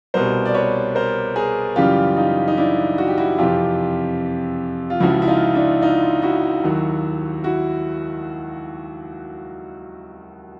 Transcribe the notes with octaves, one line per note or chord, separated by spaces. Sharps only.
C2 B2 G3 A#4 C5
D5
B4 C#5
A#4 C5
G#4 A#4
F#2 C#3 E3 G3 F4 G4
D#4 F4
D#4
D4 E4
F#4
G4
E4 F#4
F2 C3 E3 F4 G4
F4
C#2 C#3 F3 E4 F#4
E4
D#4 F4
D4 E4
D#4 F4
E4 F#4
D#2 D#3 F#3
E4 F#4